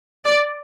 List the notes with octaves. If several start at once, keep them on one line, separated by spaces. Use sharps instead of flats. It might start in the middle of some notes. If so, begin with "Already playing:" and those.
D5